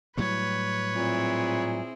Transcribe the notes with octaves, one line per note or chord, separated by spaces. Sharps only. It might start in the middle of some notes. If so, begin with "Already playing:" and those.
A2 F#3 G3 B4 C#5
A#2 C4 E4 G#4